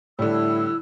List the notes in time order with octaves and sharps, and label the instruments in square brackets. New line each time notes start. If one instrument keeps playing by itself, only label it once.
[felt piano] A2 [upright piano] D3 G3 [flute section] E4 E6